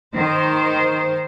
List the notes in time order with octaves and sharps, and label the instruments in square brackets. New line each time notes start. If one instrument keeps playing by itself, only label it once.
[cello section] D#3 C5